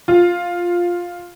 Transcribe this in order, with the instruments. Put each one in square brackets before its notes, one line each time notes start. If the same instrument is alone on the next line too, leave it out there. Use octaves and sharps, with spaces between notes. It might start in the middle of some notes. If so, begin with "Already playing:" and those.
[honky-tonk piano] F4